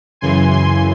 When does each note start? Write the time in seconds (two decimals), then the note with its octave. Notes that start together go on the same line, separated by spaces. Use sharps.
0.21 F#2 C#3 E3 G#5 C6
0.51 G#5 C6